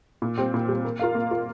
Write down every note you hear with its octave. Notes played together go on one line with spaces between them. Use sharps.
A#2
G3 C4
A#2
G3 C4
A#3
F4 A#4 F5
A#3
F4 A#4 F5